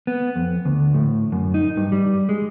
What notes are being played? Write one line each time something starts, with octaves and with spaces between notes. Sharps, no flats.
B3
F2
D2
A2
F#2
D#4
G2
G3
G#3